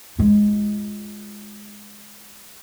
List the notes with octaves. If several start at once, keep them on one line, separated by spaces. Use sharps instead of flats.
G#3 F4